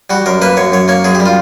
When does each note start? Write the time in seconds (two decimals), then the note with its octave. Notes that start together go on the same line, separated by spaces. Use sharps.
0.10 G3 F#4
0.26 F#2 A#4
0.42 A#3 B4
0.57 F#2 C#5
0.72 F#2 C#5
0.88 A#3 C#5
1.04 F#2 G#4
1.15 G4
1.20 G3
1.26 F4